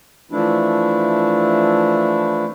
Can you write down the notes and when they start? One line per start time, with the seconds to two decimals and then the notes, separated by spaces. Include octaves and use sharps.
0.31 E3 F3 A3 D4 E4